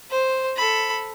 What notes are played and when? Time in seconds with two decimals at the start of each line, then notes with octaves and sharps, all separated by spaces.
0.10 C5
0.57 A4 B5